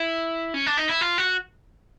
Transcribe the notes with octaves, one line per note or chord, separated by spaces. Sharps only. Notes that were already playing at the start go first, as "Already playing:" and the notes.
Already playing: E4
C#4
D4
D#4
E4
F4
F#4